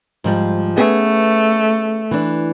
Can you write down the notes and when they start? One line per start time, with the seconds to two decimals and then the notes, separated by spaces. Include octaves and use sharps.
0.24 G#2 F3 G3
0.77 A3 B3 C#4 G#4
2.11 E3 D4